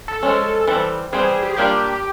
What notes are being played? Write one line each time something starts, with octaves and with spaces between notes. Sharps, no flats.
A4
F3 G#3 C#4
E3 G3 C4
E3 G3 C4 G#4
G#4
G4
G#4
G3 A#3 D4 F4 G4